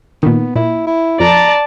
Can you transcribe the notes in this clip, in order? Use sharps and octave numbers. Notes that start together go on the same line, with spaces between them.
A#2 D#3 B3
A#2 E4
E4
F2 D5 A5 A#5